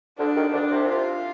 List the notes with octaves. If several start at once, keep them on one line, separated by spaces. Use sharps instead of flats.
D2 D3 D4
D#2 D#3
D2 D3 D4
C2 C3
F4